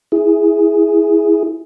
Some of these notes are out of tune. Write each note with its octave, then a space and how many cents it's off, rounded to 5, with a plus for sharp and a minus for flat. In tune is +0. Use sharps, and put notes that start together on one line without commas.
E4 +0 G#4 +0